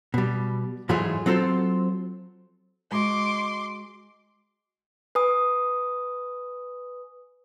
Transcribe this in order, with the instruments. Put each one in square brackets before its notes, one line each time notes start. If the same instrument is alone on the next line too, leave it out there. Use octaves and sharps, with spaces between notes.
[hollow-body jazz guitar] B2 G3
G#2 E3 F#3 A3 F4 G#4
F#3 C4 F4 A4 C5
[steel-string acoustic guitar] G#3 F#4 D#5 [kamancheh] C6 D6
[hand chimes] B4 G#5 D#6